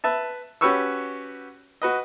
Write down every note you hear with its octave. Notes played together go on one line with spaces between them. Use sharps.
B4 E5 A5
C#4 F#4 G4 B4 C#6 E6
F#4 B4 D#5